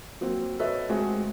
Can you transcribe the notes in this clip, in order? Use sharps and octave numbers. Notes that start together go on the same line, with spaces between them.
F#3 A#3 C4
F#4 A4 B4 C#5 D#5 E5
G#3 A3 C4 F#4 G#4